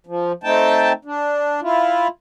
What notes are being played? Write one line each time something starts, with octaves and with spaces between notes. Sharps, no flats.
F3
A3 C4 D#4 G5 A5
D4
E4 F4